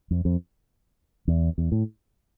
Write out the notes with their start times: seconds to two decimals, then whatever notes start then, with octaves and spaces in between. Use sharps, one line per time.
0.11 F2
0.25 F2
1.28 E2
1.58 E2
1.72 A2